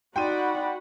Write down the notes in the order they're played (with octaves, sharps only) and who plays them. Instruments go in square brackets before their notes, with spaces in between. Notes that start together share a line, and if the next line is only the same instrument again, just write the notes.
[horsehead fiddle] D#4 D5 [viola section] F#4 F#5 B5 [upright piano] G5 C6 D#7